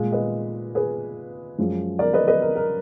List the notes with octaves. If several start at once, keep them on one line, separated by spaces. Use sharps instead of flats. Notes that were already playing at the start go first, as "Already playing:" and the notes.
Already playing: A#2 G#3
B4 D#5
G#4 B4
F#2 F3 G#3
A#4 D5
B4 D#5
B4 D#5
A#4
A#4